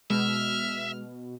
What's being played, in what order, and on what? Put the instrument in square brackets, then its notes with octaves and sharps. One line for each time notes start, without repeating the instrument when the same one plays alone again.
[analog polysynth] B2 [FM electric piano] G#3 [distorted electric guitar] E5 [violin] F6